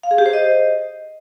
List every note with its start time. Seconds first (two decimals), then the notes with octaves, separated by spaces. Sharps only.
0.03 F5
0.11 G#4
0.18 G4
0.26 C5
0.33 D#5